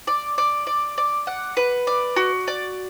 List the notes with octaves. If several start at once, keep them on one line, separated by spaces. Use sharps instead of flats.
D5
D5
D5
D5
F#5
B4
D5
F#4
D5